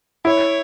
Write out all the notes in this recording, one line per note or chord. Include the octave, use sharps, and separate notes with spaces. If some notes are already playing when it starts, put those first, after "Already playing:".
E4 C#5